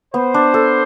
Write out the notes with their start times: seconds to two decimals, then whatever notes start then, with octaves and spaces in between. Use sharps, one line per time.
0.14 B3 C5
0.34 D4
0.54 A4